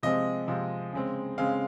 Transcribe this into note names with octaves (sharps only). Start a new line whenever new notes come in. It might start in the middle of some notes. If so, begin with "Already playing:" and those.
C3 F3 G#3 C4 D#5
C3 F3 G#3 C4
C#3 G#3 C4
C#3 G#3 C4 F5